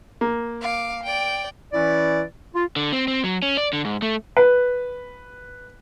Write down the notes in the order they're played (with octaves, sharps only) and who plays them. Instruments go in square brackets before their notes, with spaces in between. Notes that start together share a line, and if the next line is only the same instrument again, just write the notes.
[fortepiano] A#3
[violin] F5 D6
D5 G5
[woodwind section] E3 C#4 E4 B4 D5
F4
[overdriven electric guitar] D3
C4
C4
F#3
C#4
D5
D3
G#2
A3
[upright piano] B4